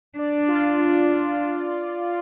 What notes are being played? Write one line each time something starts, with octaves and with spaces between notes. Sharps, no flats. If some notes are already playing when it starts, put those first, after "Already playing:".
D4 D5
F4